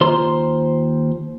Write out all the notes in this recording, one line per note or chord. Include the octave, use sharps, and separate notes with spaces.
D#2 F4 C5 A#5 C6